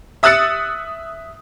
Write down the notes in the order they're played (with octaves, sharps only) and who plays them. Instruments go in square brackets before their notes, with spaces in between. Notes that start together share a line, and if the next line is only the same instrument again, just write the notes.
[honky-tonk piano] E5 D#6 E6 F#6 A6 C#7